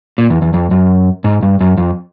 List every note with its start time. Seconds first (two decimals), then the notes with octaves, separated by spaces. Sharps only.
0.18 A#2
0.30 E2
0.42 E2
0.54 F2
0.71 F#2
1.24 G#2
1.43 G2
1.61 F#2
1.77 F2